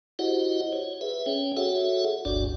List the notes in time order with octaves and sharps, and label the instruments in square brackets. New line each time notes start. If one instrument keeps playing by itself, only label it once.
[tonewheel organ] E4 F#4 G4 C5 D#5 F#5
C#5
G#4 B4 E5
C#4 C#5 G5
F#4 G#4 A4 C#5 E5 F#5
G1 C#2 G2 D4 F#4 D5